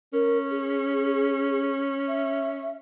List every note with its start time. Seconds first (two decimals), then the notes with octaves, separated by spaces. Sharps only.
0.13 C#4 A#4
0.51 G#4
2.08 E5